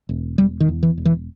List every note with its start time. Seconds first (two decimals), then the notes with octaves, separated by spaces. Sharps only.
0.09 E1
0.38 E1 G3
0.60 D#3
0.69 E2
0.83 E3
0.98 E1
1.05 E3